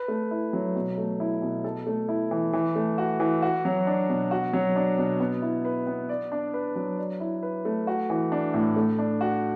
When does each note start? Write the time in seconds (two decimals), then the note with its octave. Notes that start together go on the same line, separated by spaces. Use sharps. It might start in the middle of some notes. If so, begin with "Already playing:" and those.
Already playing: B4
0.08 A3
0.31 E4
0.53 F#3
0.75 B2
0.98 A3
1.20 E4
1.42 B2
1.64 A4
1.87 A3
2.09 E4
2.31 E3
2.53 E3
2.76 A3
2.98 F#4
3.20 E3
3.42 F#4
3.65 F#3
3.87 D4
4.09 B2
4.31 F#4
4.53 F#3
4.76 D4
4.98 B2
5.20 B3
5.42 E4
5.65 B4
5.87 B3
6.09 D5
6.32 D4
6.54 B4
6.76 F#3
6.98 D5
7.20 E4
7.43 B4
7.65 A3
7.87 F#4
8.10 E3
8.32 D4
8.54 A2
8.76 A3
8.99 D4
9.21 F#4